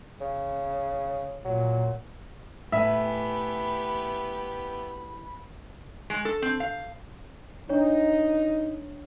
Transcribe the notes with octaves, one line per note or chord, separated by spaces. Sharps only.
C#3
A#2 F#3
A2 B3 G4 E5 G#5 B5
G#3
A4
C4
F5
D4 D#4 C#5